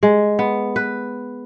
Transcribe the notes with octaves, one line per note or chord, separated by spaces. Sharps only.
G#3
B3
B4